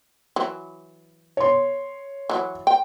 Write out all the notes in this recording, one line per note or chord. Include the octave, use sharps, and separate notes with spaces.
E3 F#3
C#5 C6
E3 F#3
G5